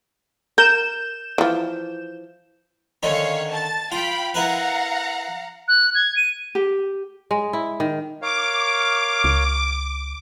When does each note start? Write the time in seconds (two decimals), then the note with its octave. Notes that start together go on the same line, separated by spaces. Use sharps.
0.58 A#4 G6 E7
1.38 E3 F3
3.03 D3 D#3 C#4 C#5 F5
3.49 A5 A6
3.92 F4 F5 G5 B5
4.34 E4 A#4 B4 F5 F#5 A#5
5.68 F#6
5.95 G#6
6.16 D#7
6.55 G4
7.31 G#3
7.53 E4
7.80 D#3
8.22 A#4 C#5 F5 D6
9.24 C#2